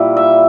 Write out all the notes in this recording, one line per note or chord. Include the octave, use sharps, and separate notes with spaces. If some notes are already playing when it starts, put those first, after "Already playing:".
Already playing: A#2 G3 E4
E5